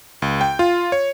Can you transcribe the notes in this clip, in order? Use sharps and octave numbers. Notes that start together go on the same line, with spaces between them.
C#2
G5
F4
C#5